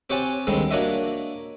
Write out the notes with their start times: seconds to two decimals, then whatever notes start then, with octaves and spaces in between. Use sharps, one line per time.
0.10 C4 G4 C#5 F#5 G#5 A5
0.47 D#2 D3 G3 G#3 C4
0.71 A#3 D4 F#4 C#5 D#5 E5